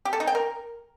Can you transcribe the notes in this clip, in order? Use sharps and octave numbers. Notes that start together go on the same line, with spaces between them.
G4
A4
D#4
G5
A#4